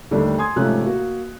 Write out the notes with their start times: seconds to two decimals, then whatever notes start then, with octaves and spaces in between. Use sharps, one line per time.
0.11 D#2 D3 G3 A3
0.38 G#5 C6 D#6 G#6
0.56 G#2 C3 F3 A3 C#4 F#6
0.85 A#3 F#4